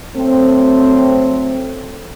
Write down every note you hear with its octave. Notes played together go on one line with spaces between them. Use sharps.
F#3 A3 C4